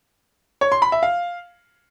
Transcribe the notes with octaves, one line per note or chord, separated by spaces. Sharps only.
C#5
C6
B5
E5
F5